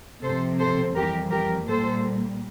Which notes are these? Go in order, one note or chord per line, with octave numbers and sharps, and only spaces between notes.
C3 F3 C4 A4 C5
A4 C5
F2 E3 G3 G4 A#4
G4 A#4
A#2 G3 A#3 A4 C5